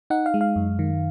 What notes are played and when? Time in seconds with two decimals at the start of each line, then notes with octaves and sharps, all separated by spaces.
0.10 D#4 F#5
0.26 F5
0.34 G#3
0.41 F5
0.56 F#2
0.79 D#3